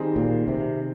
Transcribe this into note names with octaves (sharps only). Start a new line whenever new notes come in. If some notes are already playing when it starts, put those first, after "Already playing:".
Already playing: D#3 G3 C4 D#4 G#4
A#2
C3